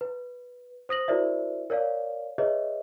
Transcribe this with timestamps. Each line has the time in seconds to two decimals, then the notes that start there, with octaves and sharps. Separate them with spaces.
0.01 B4
0.89 C5 D#6 A#6 F#7
1.08 E4 F#4 A#4 C5 D5 E5
1.70 A#4 C#5 D5 F5
2.38 G#4 B4 C#5 D#5 E5